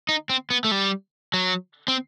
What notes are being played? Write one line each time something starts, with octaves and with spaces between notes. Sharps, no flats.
D#4
C4
B3
A3
G3
F#3
C4